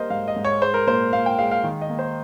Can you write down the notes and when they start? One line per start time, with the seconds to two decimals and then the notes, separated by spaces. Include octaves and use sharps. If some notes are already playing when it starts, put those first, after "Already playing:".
Already playing: G3 A#3 A#4 C5 D#5
0.10 G#2 F5
0.28 D#5
0.36 G#2
0.45 C#5
0.62 G#3 C5
0.74 A#4
0.87 A#2 C5
1.13 A#2 F5
1.26 G5
1.39 G#3 F5
1.51 F5
1.64 D#3
1.81 D#5
1.90 A#3
1.99 C5